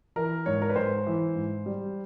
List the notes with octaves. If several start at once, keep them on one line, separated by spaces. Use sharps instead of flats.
E3 A#4
G#2 C#5
A#4
B4
G#2 C5
E3
G#2
G3